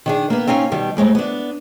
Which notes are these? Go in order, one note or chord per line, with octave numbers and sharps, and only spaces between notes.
D#3 D4 G#4
A#3 B3
C4 C#4 D#4 F5 G#5
B2 D#3 G3
D#2 G#3 A3 C4
B3 D4